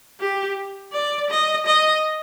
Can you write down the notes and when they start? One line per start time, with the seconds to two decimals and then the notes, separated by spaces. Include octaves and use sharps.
0.20 G4
0.93 D5
1.30 D#5
1.66 D#5